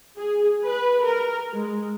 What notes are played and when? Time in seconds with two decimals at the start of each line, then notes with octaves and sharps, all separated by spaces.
0.16 G#4
0.64 B4
1.05 A#4
1.53 G#3